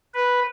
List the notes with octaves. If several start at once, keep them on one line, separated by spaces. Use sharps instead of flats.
B4